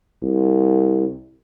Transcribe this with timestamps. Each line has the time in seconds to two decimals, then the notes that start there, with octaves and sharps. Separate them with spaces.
0.23 C2